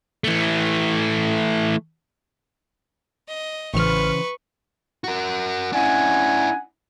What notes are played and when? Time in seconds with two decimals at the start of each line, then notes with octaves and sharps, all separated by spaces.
0.24 E3 A3
3.28 D#5
3.74 A1 C#3 E3 B4 C5 C#6 F6
5.04 F#4 A#4
5.73 C#4 D4 E4 F#5 G#5